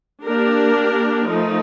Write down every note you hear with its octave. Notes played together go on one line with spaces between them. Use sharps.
A#3 D4 G4 A#4
F3 A3 D#4